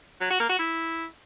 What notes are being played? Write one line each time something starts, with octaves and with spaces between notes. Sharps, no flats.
F#3
F#4
A#3
F#4
E4